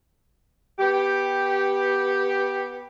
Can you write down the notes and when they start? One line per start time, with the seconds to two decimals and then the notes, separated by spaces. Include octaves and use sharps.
0.79 B3 G4